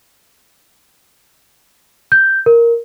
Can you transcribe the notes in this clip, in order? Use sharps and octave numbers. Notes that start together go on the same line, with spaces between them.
G6
A#4